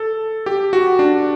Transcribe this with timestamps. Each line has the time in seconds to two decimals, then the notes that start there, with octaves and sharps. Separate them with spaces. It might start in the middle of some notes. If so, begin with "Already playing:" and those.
Already playing: A4
0.46 G4
0.73 F#4
0.99 D4